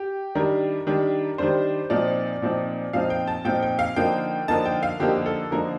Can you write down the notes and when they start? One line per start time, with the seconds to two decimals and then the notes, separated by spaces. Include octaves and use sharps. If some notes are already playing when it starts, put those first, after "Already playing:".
Already playing: G4
0.35 D#3 G3 D4 A#4
0.87 D#3 G3 D4
1.38 D#3 G3 D4 C5
1.90 A#2 F3 C4 D#4 D5
2.42 A#2 F3 C4 D#4
2.93 A#2 F3 C4 D#4 F5
3.10 G5
3.27 A5
3.45 A#2 F3 C4 D#4 G5
3.63 G5
3.79 F5
3.96 D3 F3 A#3 D#4 G5
4.48 D3 F3 A#3 D#4 A5
4.66 G5
4.83 F5
5.00 D3 F3 A#3 D#4 G4
5.15 G4
5.26 A4
5.51 D3 F3 A#3 D#4 A#4